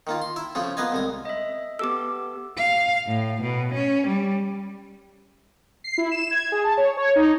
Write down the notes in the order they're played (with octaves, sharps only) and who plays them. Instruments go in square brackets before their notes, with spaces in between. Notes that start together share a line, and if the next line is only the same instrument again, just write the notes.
[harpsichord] D#3 A#3 F4
C6
E4 E5
C#3 F3 A3 C#4 G#4
A#3 B3 B4 D#5 F5 G#5
C2 G#3 D#6
[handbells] D#5 E5
[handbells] B3 G4 A4 [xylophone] D6 E6
[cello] F5
A2
B2
C#4
G3
[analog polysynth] C7
E4
E7
G#6
G#4
A5
C#5
C#5
D#4